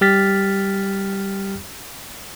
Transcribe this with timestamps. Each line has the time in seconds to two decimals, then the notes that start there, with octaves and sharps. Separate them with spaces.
0.01 G3 G4 F6 A6 B6